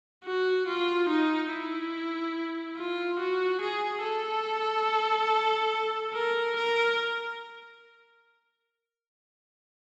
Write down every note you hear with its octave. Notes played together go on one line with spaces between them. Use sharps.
F#4
F4
D#4
E4
F4
F#4
G#4
A4
A#4
A#4